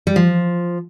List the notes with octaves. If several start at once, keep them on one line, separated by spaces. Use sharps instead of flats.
G3
F3